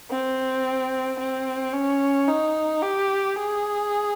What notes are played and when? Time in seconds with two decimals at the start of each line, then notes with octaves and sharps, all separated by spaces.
0.10 C4
1.19 C4
1.73 C#4
2.28 D#4
2.82 G4
3.36 G#4